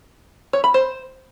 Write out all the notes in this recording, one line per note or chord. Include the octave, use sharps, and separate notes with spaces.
C#5
B5
C5